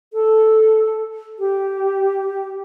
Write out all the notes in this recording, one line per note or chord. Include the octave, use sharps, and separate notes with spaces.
A4
G4